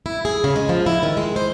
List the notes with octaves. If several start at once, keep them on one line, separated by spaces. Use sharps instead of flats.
E4
G#4
C#3
G#3
F3
E4
D#3
G#3
C5